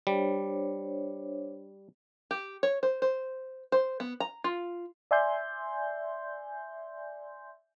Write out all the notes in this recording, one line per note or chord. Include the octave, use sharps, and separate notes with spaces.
G3 D4 C5 C#5
G4
C#5
C5
C5
C5
B3
A#5
F4
D5 E5 G#5 C6 G6